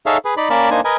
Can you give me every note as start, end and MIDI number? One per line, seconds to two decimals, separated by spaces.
0.06 0.17 63
0.06 0.17 68
0.06 0.17 69
0.06 0.17 73
0.06 0.17 76
0.06 0.17 77
0.25 0.34 68
0.25 0.34 71
0.37 0.49 63
0.37 0.49 74
0.37 0.49 83
0.50 0.70 58
0.50 0.70 61
0.50 0.70 70
0.50 0.70 74
0.50 0.70 81
0.50 0.70 83
0.71 0.81 58
0.71 0.81 62
0.71 0.81 63
0.71 0.81 72
0.71 0.81 80
0.85 0.97 70
0.85 0.97 71
0.85 0.97 75
0.85 0.97 80